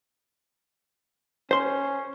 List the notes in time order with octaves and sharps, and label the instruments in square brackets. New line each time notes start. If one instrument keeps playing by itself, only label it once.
[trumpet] C#4 [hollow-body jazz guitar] C5 C6